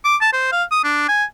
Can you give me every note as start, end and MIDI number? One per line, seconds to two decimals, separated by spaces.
0.05 0.16 86
0.21 0.30 81
0.33 0.48 72
0.52 0.64 77
0.71 0.83 87
0.84 1.07 62
1.09 1.25 80